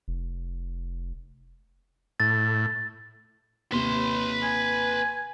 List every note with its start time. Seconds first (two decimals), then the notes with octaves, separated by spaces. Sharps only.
0.08 F1
2.20 A2 A6
3.72 D#2 C3 B4 C6
4.43 G#5